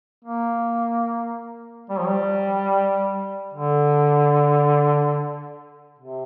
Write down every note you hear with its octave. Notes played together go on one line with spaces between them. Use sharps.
A#3
G3
F3
G3
D3
C3